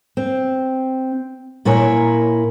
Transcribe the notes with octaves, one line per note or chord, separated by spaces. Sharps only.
C4
A#2 E4 A#4 C#5 G#5